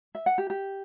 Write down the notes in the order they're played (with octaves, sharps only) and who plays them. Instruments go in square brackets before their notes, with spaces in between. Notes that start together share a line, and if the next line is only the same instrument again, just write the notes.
[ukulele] E5
F#5
G4
G4